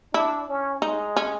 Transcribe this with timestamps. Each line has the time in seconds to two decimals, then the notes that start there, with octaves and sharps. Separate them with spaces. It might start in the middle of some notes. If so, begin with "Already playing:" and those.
0.14 D4 E4
0.49 C#4
0.82 G#3 D#4
1.16 C#4